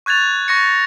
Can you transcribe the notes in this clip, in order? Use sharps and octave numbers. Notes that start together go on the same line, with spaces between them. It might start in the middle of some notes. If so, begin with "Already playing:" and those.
C#6 F#6 G#6 A6 F7
C#6 A#6 C#7